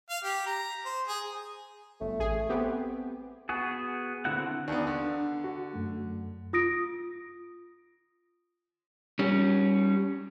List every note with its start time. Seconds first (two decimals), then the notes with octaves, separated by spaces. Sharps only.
0.10 F5
0.24 G4
0.46 A#5
0.85 C5
1.08 G#4
2.01 G1 A3
2.19 A1 G#4
2.49 B3 C4 G4
3.49 B3 F#4 G#4
4.25 D3 C4 E4 F#4 F#5
4.68 D#2 B3 D4 D5
4.87 D3
5.44 F#4
5.73 F#2 A3
6.53 F4 D#6 A#6 D7
9.19 G3 C#4